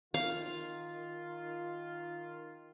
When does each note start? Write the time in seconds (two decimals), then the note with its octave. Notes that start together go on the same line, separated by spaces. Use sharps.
0.14 D#3 F4 F5